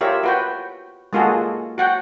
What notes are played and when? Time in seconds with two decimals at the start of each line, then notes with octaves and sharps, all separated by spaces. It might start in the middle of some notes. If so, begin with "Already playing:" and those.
0.01 F4 G4 A#4 C#5 E5
0.24 F#4 B4 G5
1.13 G#3 A#3 F4 F#4 G#4 A4
1.78 F#4 F#5 G5